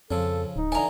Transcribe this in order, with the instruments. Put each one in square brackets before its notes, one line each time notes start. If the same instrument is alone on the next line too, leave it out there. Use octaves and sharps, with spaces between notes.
[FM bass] F2 [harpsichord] C#3 F3 [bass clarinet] A4
[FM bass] D1 [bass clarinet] D#4
[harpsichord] D3 E3 A4 [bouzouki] G#5 A#5